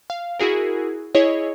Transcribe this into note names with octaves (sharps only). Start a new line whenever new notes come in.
F5
E4 F#4 G#4 A#4
E4 G#4 C#5 D#5